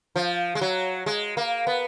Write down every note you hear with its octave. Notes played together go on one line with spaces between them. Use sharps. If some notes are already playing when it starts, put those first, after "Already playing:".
F3
G#3
F#3
G#3
A#3
B3